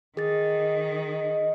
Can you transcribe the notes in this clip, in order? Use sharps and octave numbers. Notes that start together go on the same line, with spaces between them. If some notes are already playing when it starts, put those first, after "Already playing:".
D#3 G#4 D#5 A6